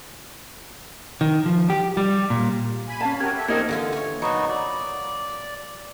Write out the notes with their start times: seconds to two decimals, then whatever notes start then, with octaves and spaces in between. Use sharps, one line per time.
1.21 D#3
1.46 F3
1.70 G4
1.97 G3
2.30 A#2
2.88 G#5 B5
3.00 C#4 F5 A5
3.20 F#3 F#4 G4 A#4 G#6
3.37 A4 E5
3.48 F2 A#3 C4 D#4 A#4 G#6
3.69 D3 E3 F4
3.93 C#5 G#5
4.22 A#2 F#3 B3 D#4 F#4
4.49 D5